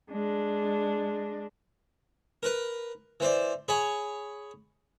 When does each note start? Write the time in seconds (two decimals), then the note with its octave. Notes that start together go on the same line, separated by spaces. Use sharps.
0.10 G#3 D4
2.43 A#4 B4
3.20 E3 C5 D5
3.68 G#4 C#5 G#5 B5